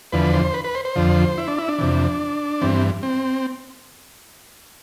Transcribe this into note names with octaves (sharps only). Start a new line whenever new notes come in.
E2 D3 F3 B4
C5
B4
B4
C5
C5
F2 D3 F3
E4
D4
E4
D4
F2 C3 E3
G2 E3 C4
C4